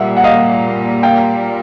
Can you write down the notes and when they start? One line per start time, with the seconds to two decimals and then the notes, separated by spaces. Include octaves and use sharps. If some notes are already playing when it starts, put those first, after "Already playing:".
Already playing: A#2 G3 A#3 E5 F#5
0.17 F#5
0.24 D#5 F5
1.03 F5 G5